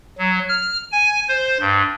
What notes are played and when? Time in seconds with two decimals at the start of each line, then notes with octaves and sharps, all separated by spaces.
0.18 F#3
0.49 F6
0.92 G#5
1.29 C5
1.60 G2